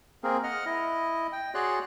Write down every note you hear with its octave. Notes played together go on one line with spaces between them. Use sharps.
A#3 C4 G#4 A#4
D#5 F#5 F6
E4 D#5
G5
F#4 G#4 C#5 D5 C6 F#6